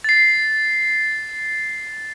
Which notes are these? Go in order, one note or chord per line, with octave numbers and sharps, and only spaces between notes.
A6 C7